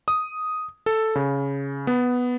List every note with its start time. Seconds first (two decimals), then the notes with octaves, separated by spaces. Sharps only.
0.08 D#6
0.86 A4
1.15 C#3
1.87 B3